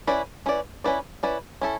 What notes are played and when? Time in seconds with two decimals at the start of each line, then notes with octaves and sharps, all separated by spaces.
0.07 C#4 E4 B4 D5
0.46 C#4 E4 B4 D5
0.84 C#4 E4 B4 D5
1.23 C#4 E4 B4 D5
1.61 C#4 E4 A4